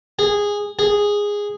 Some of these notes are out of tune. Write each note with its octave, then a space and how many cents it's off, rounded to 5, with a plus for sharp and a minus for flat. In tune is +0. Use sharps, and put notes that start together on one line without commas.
G#4 -15
G#4 -10